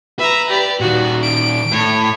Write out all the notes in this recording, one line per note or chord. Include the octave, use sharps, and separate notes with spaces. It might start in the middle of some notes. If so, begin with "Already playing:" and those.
B4 E5 A#5
G4 D5
A#2 D#3 F#4
D7
A2 C#5